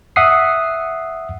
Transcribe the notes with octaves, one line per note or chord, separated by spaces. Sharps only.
E5 F#5 D#6 C7